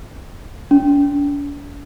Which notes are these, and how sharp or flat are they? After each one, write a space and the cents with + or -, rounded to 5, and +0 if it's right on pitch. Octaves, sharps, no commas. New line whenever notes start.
D4 -45